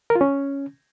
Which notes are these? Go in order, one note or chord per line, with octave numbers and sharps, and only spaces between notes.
A#4
F4
C#4